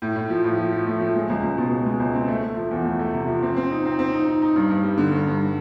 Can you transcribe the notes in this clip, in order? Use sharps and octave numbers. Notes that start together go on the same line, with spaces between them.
A2
A2
F3
A2
F3
F3
A3
F3
G#3
C#2
C#2
B2
C#2
G#3
C#2
C4
A3
A3
F3
E2
A3
A3
C3
F3
C4
C4
D#4
C4
C4
D#4
D#4
D#4
G2
G2
G3
D3
G2
G2